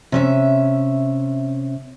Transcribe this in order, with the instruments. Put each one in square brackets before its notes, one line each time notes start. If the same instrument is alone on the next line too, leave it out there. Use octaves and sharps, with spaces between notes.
[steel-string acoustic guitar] C3 C#4 E5